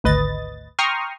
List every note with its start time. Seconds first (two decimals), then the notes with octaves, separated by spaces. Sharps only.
0.04 G#1 D2 B4 D#5 A6
0.79 G5 A#5 C6 C#6 D#6 F6